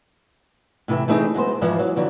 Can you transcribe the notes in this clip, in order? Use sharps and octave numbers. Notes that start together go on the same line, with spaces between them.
A2 C3 E3 F#4 E5
E3 A3 C4 D#4 G#4
F#3 G#3 B3 C5
F2 G#2 E3 F3
F#3
F2 D3 E3 F#3